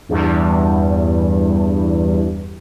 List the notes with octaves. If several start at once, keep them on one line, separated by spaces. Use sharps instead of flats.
E2 G2